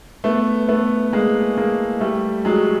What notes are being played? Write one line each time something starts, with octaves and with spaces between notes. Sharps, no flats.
A3 B3
A3 B3
G#3 A#3
G#3 A#3
G3 A3
F#3 G#3